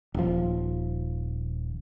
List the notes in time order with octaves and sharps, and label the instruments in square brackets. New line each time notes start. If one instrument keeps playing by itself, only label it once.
[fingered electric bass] D#1 F3